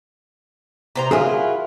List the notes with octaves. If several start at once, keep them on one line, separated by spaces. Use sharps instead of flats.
C3 C5 A#5
F#3 E4 F4 G#4 A#4 G#5